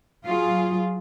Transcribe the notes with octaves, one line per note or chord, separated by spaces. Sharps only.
F#3 F4 G#4